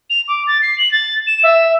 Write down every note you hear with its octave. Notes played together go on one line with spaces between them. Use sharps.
F7
D6
A6
C7
F#7
A6
E7
E5